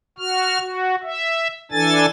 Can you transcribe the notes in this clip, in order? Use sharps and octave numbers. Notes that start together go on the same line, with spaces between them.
F#4 F6
F#4
E5
E3 D4 A4 G#5 A6